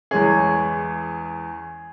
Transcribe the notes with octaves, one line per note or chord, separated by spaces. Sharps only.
E2 E3 G#3 C#4 G#4